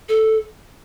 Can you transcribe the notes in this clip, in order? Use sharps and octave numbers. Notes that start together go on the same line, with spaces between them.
A4